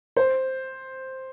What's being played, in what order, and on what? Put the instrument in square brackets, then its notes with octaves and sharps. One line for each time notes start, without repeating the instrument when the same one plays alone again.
[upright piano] C5